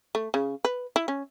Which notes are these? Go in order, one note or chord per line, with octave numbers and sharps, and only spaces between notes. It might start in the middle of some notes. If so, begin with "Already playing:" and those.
A3
C#3
B4
E4
C#4